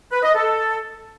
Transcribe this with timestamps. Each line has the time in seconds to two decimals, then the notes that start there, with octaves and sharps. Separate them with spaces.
0.11 B4
0.23 D#5
0.35 A4